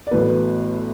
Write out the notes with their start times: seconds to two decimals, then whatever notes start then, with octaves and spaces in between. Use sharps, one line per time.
0.07 D5
0.11 A1 A2 F#3 B3 B4